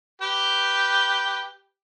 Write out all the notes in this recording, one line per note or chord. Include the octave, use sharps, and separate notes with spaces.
G4 B4 G5